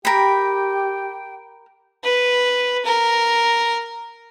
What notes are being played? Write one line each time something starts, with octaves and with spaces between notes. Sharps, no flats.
G4 A#4 G5 B5
B4
A#4